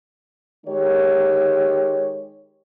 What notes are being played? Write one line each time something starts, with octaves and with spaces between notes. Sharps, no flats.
D#3 G#3 D#4 G4 C#5